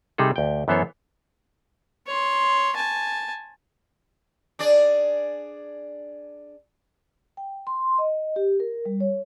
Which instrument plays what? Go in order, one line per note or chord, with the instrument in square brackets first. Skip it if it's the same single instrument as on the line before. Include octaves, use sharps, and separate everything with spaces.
[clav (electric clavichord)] C3 G3 D#4 G#4 A4
D2 G5
F#2 E3 B3 A4 C5 C#5
[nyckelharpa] C#5 C6
G#5 A5
[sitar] D4 G#4 D5
[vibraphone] G5
C6
D#5
G4
A#4
G3
C#5